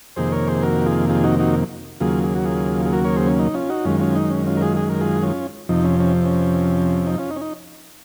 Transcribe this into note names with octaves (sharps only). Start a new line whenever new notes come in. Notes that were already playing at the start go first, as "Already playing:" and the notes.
F2 C3 D#3 A#3 G#4 C5
A#4 C#5
G#4 C5
F#4 A#4
F4 G#4
F4 G#4
D#4 F#4
D#4 F#4
D#2 C#3 F#3 A#3 F4 G#4
G#4
F#4
F4 G#4
G#4
F#4 A#4
A#4 C#5
G#4 C5
C#4
D#4
C#4 F4
D#4 F#4
F#2 D#3 G#3 C#4 F4
C#4 F4
D#4
C#4
C#4 F4
A#4
F4 G#4
G#4
A#4
F4 G#4
C#4 F4
F2 C3 F3 D#4
C#4
C#4
C#4
D#4
C#4 F4
D#4
C#4
D#4